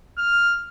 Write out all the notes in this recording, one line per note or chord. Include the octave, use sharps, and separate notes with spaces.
F6